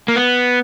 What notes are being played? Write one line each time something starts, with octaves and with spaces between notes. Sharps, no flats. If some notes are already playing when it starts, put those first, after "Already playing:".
A#3
B3